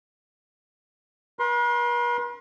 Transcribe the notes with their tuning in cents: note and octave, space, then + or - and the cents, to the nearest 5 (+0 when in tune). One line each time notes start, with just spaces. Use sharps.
B4 -45 C6 +15